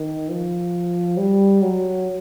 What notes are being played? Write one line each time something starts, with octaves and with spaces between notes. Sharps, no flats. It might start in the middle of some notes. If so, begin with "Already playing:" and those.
Already playing: D#3
F3
G3
F#3